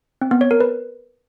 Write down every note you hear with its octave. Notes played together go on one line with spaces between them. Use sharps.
C4
B3
C#5
A#4
B4